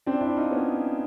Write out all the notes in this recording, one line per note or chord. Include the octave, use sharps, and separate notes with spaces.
C4 D4
D4 E4
D#4 F4
B3 C#4